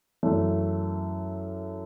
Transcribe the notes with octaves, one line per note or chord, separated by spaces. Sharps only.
F#2 E3 A3